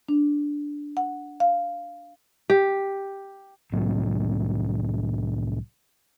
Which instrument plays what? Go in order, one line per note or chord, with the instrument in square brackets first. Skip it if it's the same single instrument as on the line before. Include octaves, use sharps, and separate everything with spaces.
[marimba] D4
F#5
F5
[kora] G4
[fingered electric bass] C2 A2 F#3 C4